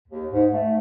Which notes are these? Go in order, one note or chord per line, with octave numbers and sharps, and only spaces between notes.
D#2
G#2
A3